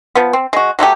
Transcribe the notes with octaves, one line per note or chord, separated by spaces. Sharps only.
F3 B3
C4
G#3 F#4
F#3 A3 F4 G4